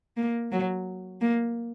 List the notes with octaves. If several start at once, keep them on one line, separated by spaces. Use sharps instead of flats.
A#3
F#3
A#3